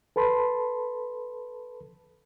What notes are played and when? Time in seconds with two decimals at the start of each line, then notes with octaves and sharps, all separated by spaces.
0.16 A4 B4 A5 B5 C6